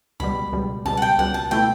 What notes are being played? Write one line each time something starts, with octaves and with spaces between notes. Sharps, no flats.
C#2 B2 G3 B5
C#2 B2 G3
C#2 B2 G3 A5
F#5
G5
C#2 B2 G3 F#5
A5
B2 A3 E4 G5